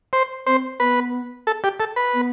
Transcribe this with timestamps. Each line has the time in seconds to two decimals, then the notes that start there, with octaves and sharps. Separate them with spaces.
0.13 C5
0.47 C4 C5
0.80 B3 B4
1.47 A4
1.64 G4
1.80 A4
1.96 B4
2.14 B3